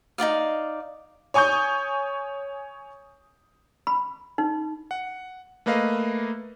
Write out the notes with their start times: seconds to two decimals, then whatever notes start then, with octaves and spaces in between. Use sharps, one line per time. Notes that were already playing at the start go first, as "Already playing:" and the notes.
0.18 D#4 F4 D5 F5
1.34 C#5 G#5 C#6 D#6 G6
3.87 B5
4.38 D#4
4.91 F#5
5.66 A3 A#3 B4 D#5 F5